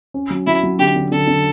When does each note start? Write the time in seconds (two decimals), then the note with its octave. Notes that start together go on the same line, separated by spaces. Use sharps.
0.14 C#4
0.30 F#3
0.47 F#3 E4
0.63 F#3
0.79 D3 G4
0.96 D3
1.12 D3 A4
1.27 D3